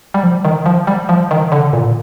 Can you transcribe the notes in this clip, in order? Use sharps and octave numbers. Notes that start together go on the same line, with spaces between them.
G3
F3
D#3
F3
G3
F3
D#3
D3
A#2